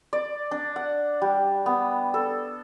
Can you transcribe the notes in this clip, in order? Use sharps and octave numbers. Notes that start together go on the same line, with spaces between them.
D5
D4
F#5
G3
B3
A4